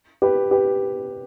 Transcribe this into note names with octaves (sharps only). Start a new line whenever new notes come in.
G4 B4
G4 B4